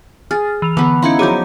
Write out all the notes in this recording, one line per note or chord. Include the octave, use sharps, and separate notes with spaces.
G#4 F6 A6
E3 F7
D3 E3 B3 B4
C#4 D#4 E4 F5 F#5 C6
F3 F#3 G#4 D6 G6